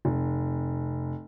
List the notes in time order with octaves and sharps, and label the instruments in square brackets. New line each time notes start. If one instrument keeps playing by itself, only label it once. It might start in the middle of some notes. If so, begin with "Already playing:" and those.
[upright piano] F1